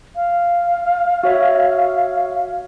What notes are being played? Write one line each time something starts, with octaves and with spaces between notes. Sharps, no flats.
F5
F#4 C#5 E5